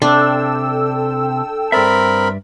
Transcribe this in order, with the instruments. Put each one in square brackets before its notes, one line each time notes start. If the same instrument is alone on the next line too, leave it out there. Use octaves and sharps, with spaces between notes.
[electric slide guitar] C3 [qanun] D4 [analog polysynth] A4 G5 E6
[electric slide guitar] G2 D5 E5 [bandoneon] C4 A#4 B5